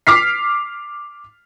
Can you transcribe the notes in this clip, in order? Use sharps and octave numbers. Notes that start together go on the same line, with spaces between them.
D6 F6 B6 C7